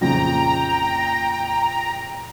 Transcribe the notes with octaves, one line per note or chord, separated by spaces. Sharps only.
A#1 F2 C#3 G5 A#5